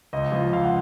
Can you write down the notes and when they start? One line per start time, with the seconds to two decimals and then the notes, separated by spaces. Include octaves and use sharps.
0.13 C#2 D#5
0.32 F3
0.52 C#2 F5
0.63 F#5